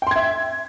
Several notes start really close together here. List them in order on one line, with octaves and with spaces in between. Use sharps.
G5 C6 G#6 E5